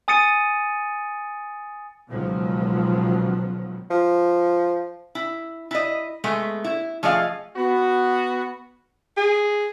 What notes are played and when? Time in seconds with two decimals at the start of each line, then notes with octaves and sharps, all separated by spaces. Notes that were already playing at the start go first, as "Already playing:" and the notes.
0.08 G#5 D#6 A6 C#7 D#7
2.10 C#2 B2 D#3 F3 F#3
3.90 F3
5.15 E4
5.71 E4 D#5
6.24 G#3 A3 B3
6.64 E4
7.03 F3 A3 G#4 D#5 F5
7.56 B3 F#4
9.17 G#4